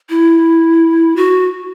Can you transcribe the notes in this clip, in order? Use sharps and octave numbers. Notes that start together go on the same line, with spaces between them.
E4
F#4